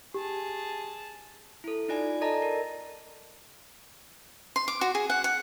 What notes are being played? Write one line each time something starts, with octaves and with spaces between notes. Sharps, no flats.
G4 G#4 A5
E4 A4
D#4 F4 D5 G#5
A4 D5 D#5 A5 A#5 A#6
A#4
C6
D6
F#4
G#4
F#5
F#5